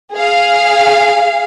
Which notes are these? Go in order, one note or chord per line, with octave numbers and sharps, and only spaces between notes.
G#4 F5